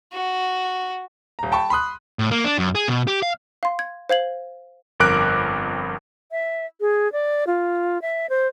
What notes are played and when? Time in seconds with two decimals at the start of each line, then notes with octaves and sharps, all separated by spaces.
0.13 F#4
1.39 D#1 A#5
1.52 G5 A5 B5 C#6
1.70 B5 C6 D#6 F#6
2.19 A2
2.31 A#3
2.44 D4
2.59 F#2
2.75 G#4
2.88 B2
3.07 G4
3.23 F5
3.63 F5 C6
3.79 G#6
4.09 C5 F5 G#6 F#7
5.00 G1 F2 A#4 D6 F#6 D7
6.32 E5
6.81 G#4
7.12 D5
7.47 F4
8.02 E5
8.30 C5